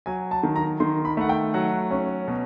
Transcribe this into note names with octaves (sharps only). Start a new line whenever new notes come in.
F#3 G#5
A5
D#3
A#5
D#3 C6
B5
A3 F#5
G5
F#3 F#5
C#4
B2